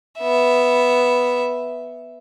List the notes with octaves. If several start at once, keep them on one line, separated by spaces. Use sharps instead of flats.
B3 E5